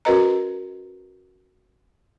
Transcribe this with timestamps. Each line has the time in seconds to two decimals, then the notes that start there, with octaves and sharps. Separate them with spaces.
0.05 C#4 F#4 A#4 B4 D#5 A#5